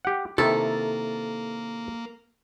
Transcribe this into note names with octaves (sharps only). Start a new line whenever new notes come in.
G4 F#5
C3 D#3 A#3 E4 A4